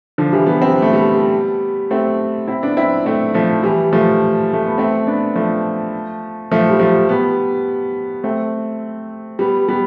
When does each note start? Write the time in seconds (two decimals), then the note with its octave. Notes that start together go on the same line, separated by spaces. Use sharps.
0.18 D3 F3
0.33 E3 G3
0.46 G3 B3
0.62 C4
0.72 B3
0.82 A3
0.93 G3 B3
1.91 A3 C4
2.48 C4 E4
2.63 B3 D4
2.77 C4 E4
3.06 A3 C4
3.34 F3 A3
3.63 E3 G3
3.93 F3 A3
4.53 A3
4.66 B3
4.78 A3 C4
5.07 B3 D4
5.36 F3 A3
6.51 F3 A3
6.70 G3
6.80 F3 A3
7.09 G3 B3
8.24 A3 C4
9.39 G3 B3
9.68 G3 B3